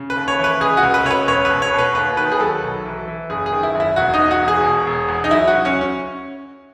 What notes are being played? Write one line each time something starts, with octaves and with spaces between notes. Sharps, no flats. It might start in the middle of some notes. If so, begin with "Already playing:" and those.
Already playing: C#3
B4
D#2
C#5
E3
B4
C#2 G#4
F#4
C#2
B4
C#2 C#5
B4
E1 C#5
B2 B4
C#5
B2
B4
D#2 B4
D#3 B4
G#4
F#3 A4
B1
E3
E3
F#1 G#4
G#4
D#3
E4
F#1
E4
E1 F#4
D#4
E2
F#4
E1
G#4
B2
E1
E2
D#4
F#3 E4
F#4
C#2
C#4
C#4